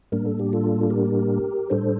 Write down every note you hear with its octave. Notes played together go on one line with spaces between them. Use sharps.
A2 G3 A#3 D4 A#4
A4
G4
F4 A4
G4 A#4
A2 G3 D4 A4 C5